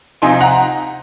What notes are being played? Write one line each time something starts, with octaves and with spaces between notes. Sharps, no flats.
C3 F3 C4 D#4 G#5 C6
F#5 A#5